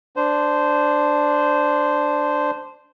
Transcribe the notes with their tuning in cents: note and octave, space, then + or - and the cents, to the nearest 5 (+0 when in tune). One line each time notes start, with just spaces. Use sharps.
D4 +0 C5 -10